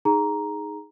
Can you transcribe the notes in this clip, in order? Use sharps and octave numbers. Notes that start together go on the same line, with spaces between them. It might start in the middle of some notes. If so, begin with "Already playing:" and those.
D#4 G#4 A#5